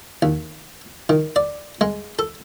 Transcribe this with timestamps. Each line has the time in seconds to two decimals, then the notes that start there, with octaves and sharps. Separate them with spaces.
0.22 D#2
1.09 D#3
1.36 D5
1.81 G#3
2.19 A4